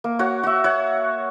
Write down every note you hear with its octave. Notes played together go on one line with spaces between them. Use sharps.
A#3
F#4 C#5 F#5
F#4 E5
C#5 F#5